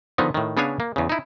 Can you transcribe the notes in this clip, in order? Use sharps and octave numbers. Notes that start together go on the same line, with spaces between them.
D3 D#3 F3 B3 D#4
A2 D#3
C#3 B3 D4 C#5 F5 G#5
A#3
E2 C#3
D#4 E4